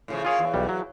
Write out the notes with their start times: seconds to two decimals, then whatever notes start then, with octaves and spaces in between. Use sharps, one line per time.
0.08 A2 C#3 F3
0.24 A#3 C#4 F4 G#4 C#5
0.39 E2
0.54 B1 G3
0.69 F#3